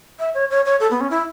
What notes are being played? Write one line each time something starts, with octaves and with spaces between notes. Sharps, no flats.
E5
C#5
C#5
C#5
A4
B3
C#4
E4